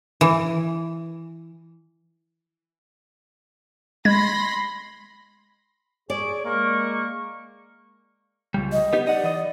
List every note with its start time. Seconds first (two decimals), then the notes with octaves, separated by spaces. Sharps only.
0.21 E3
4.05 G#3 B5 C6 G#6 A#6
6.10 G#4 C#5 D5 D7
6.45 G#3 A#3 C#6
8.54 C#2 G3
8.72 D#5
8.93 B3 D#4 G4
9.07 D5 D#5 F#5
9.24 E3 D#5